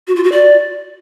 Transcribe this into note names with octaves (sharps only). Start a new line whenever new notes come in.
F#4
F4
F#4
D5